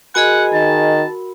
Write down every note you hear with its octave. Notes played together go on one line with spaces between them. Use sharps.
F#4 G#4 A#4 D#5 F#5 G#5 B5
D#3 A5